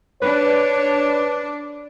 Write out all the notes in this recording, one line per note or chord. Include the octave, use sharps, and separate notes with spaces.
D4 B4 C#5